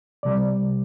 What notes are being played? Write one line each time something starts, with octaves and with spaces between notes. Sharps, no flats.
C3 G3 D5